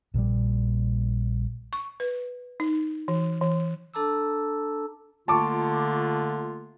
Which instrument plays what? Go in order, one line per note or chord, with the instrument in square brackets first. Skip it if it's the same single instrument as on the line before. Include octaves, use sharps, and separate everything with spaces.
[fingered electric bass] A#1 A#2 C#3 G3
[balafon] C#6
B4
D#4
E3
E3
[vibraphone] D4 A4 A5 A#5 D6 E6
[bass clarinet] D3 [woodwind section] A3 A#3 F4 [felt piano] A5 C#6 D6